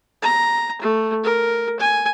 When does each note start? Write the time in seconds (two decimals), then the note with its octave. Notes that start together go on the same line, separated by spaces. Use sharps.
0.22 A#5
0.81 A3
1.24 A#4
1.79 G#5